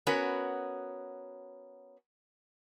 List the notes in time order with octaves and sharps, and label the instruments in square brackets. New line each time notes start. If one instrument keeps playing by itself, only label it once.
[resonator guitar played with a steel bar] B3 C#4 F#4 A#4